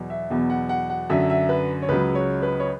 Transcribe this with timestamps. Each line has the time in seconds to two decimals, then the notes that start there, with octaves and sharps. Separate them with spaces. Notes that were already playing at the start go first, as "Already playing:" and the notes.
Already playing: E2 B2 F#3
0.10 E5
0.30 E2 B2 F#3
0.50 F#5
0.69 F#5
0.90 F#5
1.10 F#2 D3 F#3 E5
1.30 E5
1.49 B4
1.82 C#5
1.89 C#2 C#3 F#3 B4
2.15 C#5
2.42 B4
2.60 C#5